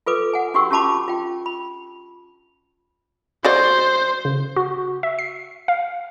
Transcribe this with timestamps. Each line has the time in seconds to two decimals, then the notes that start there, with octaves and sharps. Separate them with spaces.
0.06 F4 A4 B4 D6
0.33 F#5 G#5
0.54 D4 F#4 G4 G5 C#6 E6
0.71 C#4 F4 G4 A5 B5 D6
1.08 F4 G5
1.46 B5
3.44 F#4 C5 D5 D#5
4.25 C#3
4.56 F#4
5.03 E5
5.19 C7
5.68 F5